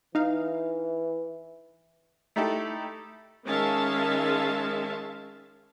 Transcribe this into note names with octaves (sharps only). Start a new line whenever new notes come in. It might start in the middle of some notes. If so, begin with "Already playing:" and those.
E3 D#4 F5
A3 D#4 E4 G4 A4
D#3 G#3 C#4 E5 F5 A5